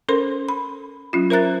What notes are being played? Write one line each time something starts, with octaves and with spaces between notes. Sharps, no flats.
C#4 A4 A#4 C5 C6
B5
F#3 C#4 F4
A#4 C5 E5 A#5 F#6 A6